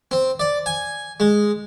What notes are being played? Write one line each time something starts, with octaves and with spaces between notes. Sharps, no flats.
C4
D5
G#5
G#3